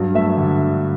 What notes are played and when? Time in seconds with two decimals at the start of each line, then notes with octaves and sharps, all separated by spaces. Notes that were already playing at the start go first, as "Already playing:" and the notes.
Already playing: G2 F#3
0.15 A3 E5
0.38 D3